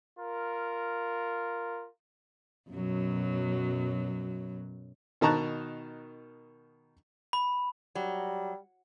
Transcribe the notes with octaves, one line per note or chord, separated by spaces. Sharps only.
F4 A#4
F#2 B2 F#3
B2 D#3 A5 A#5 C#6 F#6
B5
F#3 G3